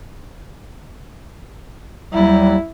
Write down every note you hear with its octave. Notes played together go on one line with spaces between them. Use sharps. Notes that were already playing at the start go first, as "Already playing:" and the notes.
D#2 F#3 G3 E4